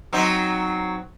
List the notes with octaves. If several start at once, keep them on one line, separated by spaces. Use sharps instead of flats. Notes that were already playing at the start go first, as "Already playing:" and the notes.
F#3 C4 D#4